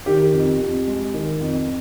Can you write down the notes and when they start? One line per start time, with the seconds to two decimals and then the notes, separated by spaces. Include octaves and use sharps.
0.06 D#3 G4
0.33 F2
0.60 F2
0.88 G#3
1.14 D#3
1.41 F2